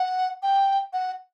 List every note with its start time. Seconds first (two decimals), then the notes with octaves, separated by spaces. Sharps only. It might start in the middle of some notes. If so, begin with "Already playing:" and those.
Already playing: F#5
0.43 G5
0.93 F#5